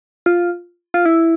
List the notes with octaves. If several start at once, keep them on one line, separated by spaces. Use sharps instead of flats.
F4
F4
E4